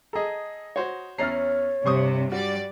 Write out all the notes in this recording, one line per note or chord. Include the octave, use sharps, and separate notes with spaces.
G#4 A4 D#5 A#5
F#4 C5 C#5
E2 C#4 C#5 A#5 F6 A6 C7
G2 C3 C5 C#6 D#6
G3 F#4 D5